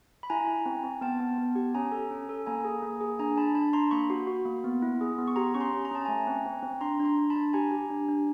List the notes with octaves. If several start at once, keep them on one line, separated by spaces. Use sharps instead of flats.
B5
E4 G#5 A#5
E4
C4
C4
B3 G5 A5
B3
B3
G4
C#4 G#5 A#5
A4
C#4
A4
A#3 G#5 A#5
G#4
A#3
G#4
D4 G#5 A#5
D4 A5 B5
D4 A5 B5
D4 A#5 C6
A#3 B5 C#6
F#4
F#4
A#3
B3
E4
G#4
B3
C#6
G4 A#5 C6
C#4 C#6
A#5 C6
C#4
A#5
C#4 A5
A3 G#5 A#5
C4
C4
C4
D4 A#5 C6
D4
A#5 C6
D4
A5 B5
D4
G4 G#5 A#5
G4
D4
D4